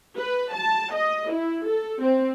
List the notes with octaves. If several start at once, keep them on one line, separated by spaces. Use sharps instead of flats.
B4
A5
D#5
E4
A4
C4